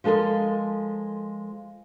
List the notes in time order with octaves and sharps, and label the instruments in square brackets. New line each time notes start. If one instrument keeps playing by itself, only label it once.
[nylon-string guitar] F3 G#3 A4 A#4 D#5